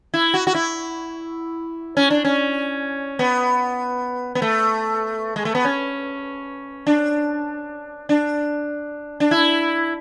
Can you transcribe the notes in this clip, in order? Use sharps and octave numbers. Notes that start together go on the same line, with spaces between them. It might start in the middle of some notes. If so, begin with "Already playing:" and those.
E4
F#4
F#4
E4
C#4
D4
C#4
B3
B3
A3
G#3
A3
B3
C#4
D4
D4
D4
E4